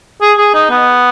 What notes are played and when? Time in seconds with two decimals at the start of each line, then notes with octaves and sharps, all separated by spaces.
0.22 G#4
0.38 G#4
0.54 D#4
0.71 B3